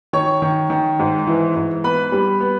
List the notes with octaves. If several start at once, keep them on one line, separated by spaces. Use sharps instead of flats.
D#3 C#5 C#6
D#3
D#3
G#2
E3
G#2
B3 B4 B5
G3
B3